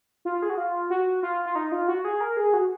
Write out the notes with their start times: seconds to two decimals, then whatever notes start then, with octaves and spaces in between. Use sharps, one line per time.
0.25 F4
0.42 G#4
0.50 F#4
0.58 F4
0.90 F#4
1.23 F4
1.46 F4
1.55 D#4
1.72 F4
1.88 F#4
2.05 G#4
2.21 A#4
2.37 G#4
2.53 F#4